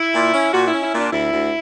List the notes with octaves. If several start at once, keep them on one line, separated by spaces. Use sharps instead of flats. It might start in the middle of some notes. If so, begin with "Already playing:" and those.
Already playing: E4
A#2
C#4
A#2 F#4
C#4 E4
E4
A#2
D4
D2 E4
D2